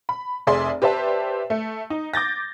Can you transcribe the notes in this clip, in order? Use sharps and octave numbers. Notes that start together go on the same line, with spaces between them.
B5
F1 G#4 D5 E5 G#5 C6
G4 B4 C5 D5 E5 A5
A3
D#4
D6 G6 A6 A#6